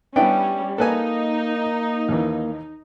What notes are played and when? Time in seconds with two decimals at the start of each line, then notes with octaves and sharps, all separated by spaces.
0.16 G3 B3 C#4 D4 E4 G5
0.78 A#3 D#4 A4 B4 G#5
2.09 D#2 E3